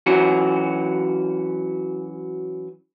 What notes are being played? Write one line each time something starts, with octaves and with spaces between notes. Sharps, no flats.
E3 F#3 C#4 F#4